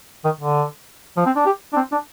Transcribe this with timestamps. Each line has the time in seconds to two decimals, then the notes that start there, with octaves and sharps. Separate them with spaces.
0.25 D#3
0.41 D3
1.17 F3
1.26 C4
1.36 D4
1.46 G4
1.73 D4
1.76 C4
1.92 D4